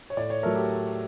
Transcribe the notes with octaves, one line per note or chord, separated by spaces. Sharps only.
C#5
A2 D5
C#5
F#3 A3 A#4
G4